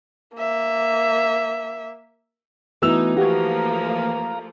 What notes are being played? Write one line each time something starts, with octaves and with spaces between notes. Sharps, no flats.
A#3 E5
E3 A3 B3 D#4 F#4 E6 F7
F3 A3 A#3 F#4 G4 F5 A#5